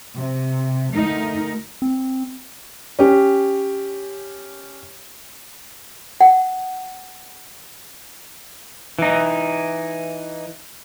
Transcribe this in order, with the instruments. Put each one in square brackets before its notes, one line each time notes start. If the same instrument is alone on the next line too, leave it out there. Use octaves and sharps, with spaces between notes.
[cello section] C3
D2 A3 D#4 A#4
[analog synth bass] C4
[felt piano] C#4 G4
[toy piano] F#5
[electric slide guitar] E3 D#4